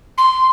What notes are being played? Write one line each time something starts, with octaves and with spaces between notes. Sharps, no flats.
C6